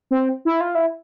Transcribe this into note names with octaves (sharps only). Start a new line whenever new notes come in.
C4
E4
F4
E4